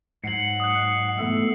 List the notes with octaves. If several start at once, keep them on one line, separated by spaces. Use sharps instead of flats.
G#2 F#3 F#5 C7 C#7 F#7
D#6 F#6
G#2 B2 E3 A3 B3 A4